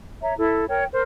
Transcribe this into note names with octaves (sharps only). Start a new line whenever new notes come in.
C#5 E5 A#5
E4 A4
A#4 C#5 G5
A#4 C5